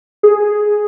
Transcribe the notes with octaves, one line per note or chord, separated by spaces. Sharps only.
G#4